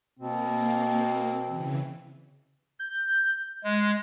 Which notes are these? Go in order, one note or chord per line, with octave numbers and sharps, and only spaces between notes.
B2 A#3 C4
C#3 E3
G6
G#3